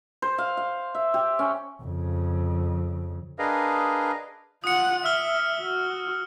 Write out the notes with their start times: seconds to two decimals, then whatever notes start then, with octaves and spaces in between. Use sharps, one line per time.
0.22 C5
0.38 F5
0.57 F5
0.95 E5
1.14 G4
1.39 C#4
1.83 F2 C#3
3.39 D4 G#4 A#4 B4 D#5 F5
4.64 F4 F#5 D#6 C#7
5.05 E5 E6 F6 G7
5.60 F#4